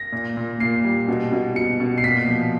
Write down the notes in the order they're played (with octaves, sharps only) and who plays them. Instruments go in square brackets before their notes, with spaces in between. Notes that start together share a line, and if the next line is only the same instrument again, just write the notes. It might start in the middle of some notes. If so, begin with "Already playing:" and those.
Already playing: [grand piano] A#6
A#2
A#2
A#2 C7
G3
B2
B2
B2 C#7
B2
C7
A#2 B6
F3